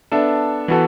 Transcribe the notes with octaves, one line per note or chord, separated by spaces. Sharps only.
B3 D4 A4 E5
E3 B3 F#4 A4